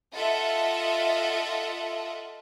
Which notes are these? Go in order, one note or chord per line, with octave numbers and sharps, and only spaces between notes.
F4 A4 D#5 E5 F#5